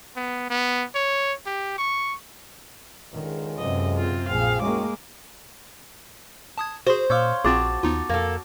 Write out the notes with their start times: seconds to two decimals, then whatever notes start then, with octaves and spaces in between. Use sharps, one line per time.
0.16 B3
0.50 B3
0.95 C#5
1.46 G4
1.78 C#6
3.13 C#2 D3 D#3 G#3
3.58 F#2 C3 D#5
3.97 C4 F4
4.28 A#1 C4 F4 G#4 F5
4.62 F#2 D#3 G#3 A#3 C#4 D6
6.58 A5 D#6 G#6
6.87 F#4 G#4 C5
7.10 A#2 C#5 F5 D6 E6 G6
7.45 A#1 C4 F4 F#4 G#4 A5 D6
7.84 D#2 B3 D#4 F4
8.10 F2 A#3 A4